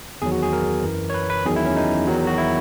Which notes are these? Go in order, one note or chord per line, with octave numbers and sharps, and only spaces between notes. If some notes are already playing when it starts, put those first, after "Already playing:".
E2 D#3 F#3 G#4
F#4
G#4
A#4
F#2 E3
C#5
B4
B4
E2 D#3 F#3 G#4
E4
C#4
D#4
E2 D#3 F#3
F#4
E4